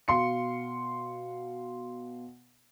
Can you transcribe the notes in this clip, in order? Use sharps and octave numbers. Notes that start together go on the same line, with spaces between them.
B2 F5 C6 C#7